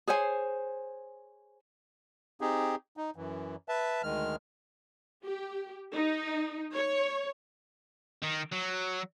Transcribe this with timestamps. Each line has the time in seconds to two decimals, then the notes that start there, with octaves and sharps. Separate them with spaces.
0.07 G#4 C5 C#5 G#5
2.41 C4 D#4 G4 G#4
2.97 D#4
3.16 F#2 E3
3.69 B4 E5 A5
4.03 D2 D#3 G#3 F6
5.25 G4
5.94 D#4
6.74 C#5
8.22 D#3
8.52 F#3